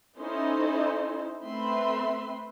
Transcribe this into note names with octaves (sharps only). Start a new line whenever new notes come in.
C#4 D#4 E4 A4 C5
A3 C4 B4 E5 B5 C6